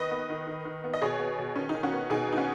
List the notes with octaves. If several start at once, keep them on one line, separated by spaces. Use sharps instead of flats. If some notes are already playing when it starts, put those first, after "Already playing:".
Already playing: D#3 B3 B4 D#5
B3
D#3
D#3
D#3
B3
D#5
B2 G#4 C#5
B3
B2
D#3 C#4
D#4
D#3
C#4 F#4
B3
B2 D#4 G#4
B3 D#4
C#4 F#4